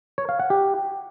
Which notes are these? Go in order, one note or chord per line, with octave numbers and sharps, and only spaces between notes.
C#5
F5
F#5
G4